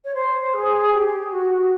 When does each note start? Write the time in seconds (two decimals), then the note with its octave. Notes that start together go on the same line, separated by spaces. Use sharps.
0.04 C#5
0.14 C5
0.54 G#4
0.93 G4
1.32 F#4